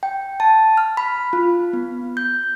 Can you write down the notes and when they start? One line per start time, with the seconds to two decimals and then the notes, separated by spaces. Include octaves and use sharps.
0.03 G5
0.40 A5
0.77 F6
0.97 B5
1.33 F4
1.73 B3
2.17 G6